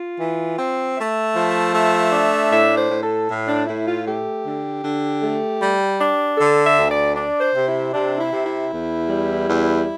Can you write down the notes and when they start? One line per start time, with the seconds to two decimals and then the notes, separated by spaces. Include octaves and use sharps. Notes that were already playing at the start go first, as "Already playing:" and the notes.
Already playing: F4
0.19 E3
0.57 C4
0.96 A3 E5
1.35 F3
1.74 A3
2.12 D4
2.51 A2 E5
2.77 C5
2.90 A2
3.03 A4
3.28 A2
3.48 D4
3.67 A2 E4
3.86 F4
4.06 A3 G4
4.45 D3
4.83 D3
5.22 A3
5.61 G3
6.00 D4
6.38 D3 A4
6.64 E5
6.77 D2
6.90 D5
7.15 D4 D5
7.41 C5
7.55 C3
7.68 E4
7.93 C3 D4
8.18 E4
8.31 C3
8.45 E4
8.71 E2
9.09 G3
9.47 E2